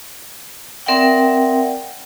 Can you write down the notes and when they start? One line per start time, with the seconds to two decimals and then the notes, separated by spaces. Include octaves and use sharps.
0.86 C4 A#4 D5 E5 F#5 G5